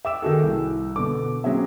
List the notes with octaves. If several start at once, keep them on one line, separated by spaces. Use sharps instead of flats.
E5 G5 D6 E6 E7
D#3 D#4 F#4 G#4 A4
C2
B2 D3 D6
F#3 C4 C#4 G#4 E5